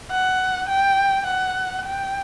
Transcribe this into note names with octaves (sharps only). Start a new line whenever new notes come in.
F#5
G5
F#5
G5